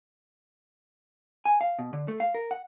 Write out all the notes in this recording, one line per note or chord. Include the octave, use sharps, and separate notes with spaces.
G#5
F5
B2
D3
A3
F5
A#4
F#5